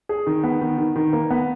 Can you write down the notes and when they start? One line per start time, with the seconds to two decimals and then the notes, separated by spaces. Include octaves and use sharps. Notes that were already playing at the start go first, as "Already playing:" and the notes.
0.09 G#4
0.27 D#3
0.44 B3
0.61 D#3
0.78 D#3
0.96 D#3
1.13 A#3
1.31 B3